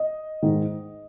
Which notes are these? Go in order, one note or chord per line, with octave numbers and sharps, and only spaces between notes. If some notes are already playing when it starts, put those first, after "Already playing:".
Already playing: D#5
G#2 D#3